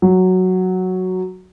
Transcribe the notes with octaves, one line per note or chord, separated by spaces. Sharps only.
F#3